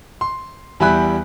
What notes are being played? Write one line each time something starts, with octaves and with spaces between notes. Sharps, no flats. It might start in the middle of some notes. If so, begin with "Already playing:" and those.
C6
E2 G3 E5 G#5 B5 F#6